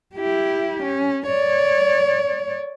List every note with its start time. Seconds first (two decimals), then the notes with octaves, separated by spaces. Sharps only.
0.15 E4 G4
0.83 C#4
1.27 C#5 D5